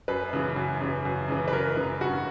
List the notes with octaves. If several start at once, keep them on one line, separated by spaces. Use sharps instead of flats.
F#2 B4
C#3 E3
F#2
C#3 E3
F#2
C#3 E3
B4
F#2 A#4
C#3 E3
G2 F#4